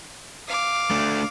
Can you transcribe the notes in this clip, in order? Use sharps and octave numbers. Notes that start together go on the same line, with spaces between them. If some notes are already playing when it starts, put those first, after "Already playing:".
F5 D6
A3 D4